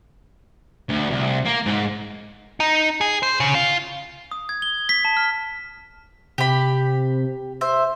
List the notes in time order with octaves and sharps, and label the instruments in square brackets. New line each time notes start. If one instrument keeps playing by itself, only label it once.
[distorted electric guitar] D2
C2
A#3
G#2
[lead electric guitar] D#4
G#4
C5
C#3
F4
[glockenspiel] D#6
G#6
G7
B6
A5
F6
[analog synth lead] C3 [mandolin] G4 B5
[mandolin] C5 [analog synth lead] E5